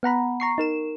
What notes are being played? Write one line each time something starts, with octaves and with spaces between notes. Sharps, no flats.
B3 F#5 A#5 B5
A#5 C#6 C7
D#4 A#4 E7